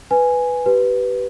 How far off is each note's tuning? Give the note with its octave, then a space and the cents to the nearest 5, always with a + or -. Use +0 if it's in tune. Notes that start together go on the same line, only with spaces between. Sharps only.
B4 +5 G#5 +0
G4 -25 B4 +0